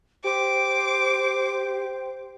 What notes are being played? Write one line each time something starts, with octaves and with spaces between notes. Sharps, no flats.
G4 C5 D6